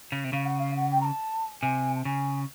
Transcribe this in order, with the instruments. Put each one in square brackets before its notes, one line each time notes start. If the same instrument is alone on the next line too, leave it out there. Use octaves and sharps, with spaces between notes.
[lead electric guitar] C#3
C3
[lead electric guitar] C#3 [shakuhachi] F5
[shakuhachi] F#5
F5
F#5
G5
A#5
A5
[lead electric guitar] C3 [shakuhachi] G#5
[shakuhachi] A5
[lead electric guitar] C#3 [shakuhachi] G#5